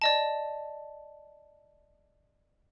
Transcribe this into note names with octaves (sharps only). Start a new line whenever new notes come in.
D5 D#5 A5